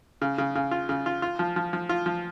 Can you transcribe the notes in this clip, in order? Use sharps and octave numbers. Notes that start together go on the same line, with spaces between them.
C#3
C#3
C#3
F4
C#3
F4
F4
F3
F3
F3
F4
F3